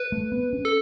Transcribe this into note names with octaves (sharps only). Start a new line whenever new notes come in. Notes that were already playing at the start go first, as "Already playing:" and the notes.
Already playing: B4
A3
B3
C#4
A4